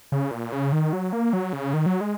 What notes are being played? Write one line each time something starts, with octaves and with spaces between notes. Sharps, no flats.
C#3
A#2
C#3
D#3
F#3
A#3
F#3
C#3
D#3
F#3
G#3